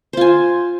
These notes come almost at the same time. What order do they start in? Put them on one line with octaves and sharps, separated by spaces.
C5 F4 G#5